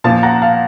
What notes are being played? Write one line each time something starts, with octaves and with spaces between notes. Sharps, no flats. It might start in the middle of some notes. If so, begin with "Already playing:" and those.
A#2 F3 F5 A5
F#5 A#5
F5 A5